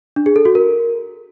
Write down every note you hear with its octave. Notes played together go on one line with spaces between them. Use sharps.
D4
G#4
A4
F#4
A#4